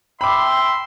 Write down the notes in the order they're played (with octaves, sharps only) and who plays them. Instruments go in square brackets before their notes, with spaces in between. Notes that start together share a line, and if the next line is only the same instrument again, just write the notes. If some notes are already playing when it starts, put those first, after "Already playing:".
[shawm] E5 [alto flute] G5 [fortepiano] B5 D6 [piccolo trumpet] C6